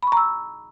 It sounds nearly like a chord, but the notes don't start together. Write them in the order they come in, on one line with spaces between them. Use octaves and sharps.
B5 C#6 A#5 E6